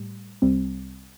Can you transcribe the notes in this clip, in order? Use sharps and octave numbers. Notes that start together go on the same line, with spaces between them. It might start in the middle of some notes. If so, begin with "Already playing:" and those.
Already playing: A2 G3
C2 C3 G3 C4